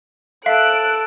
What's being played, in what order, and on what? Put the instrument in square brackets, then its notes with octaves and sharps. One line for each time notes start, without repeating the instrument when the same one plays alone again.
[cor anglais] A4 [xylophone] E5 F5 [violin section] F#6 D7